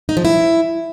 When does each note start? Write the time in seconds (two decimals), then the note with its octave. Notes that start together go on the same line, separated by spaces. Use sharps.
0.09 D#4
0.17 F3
0.25 E4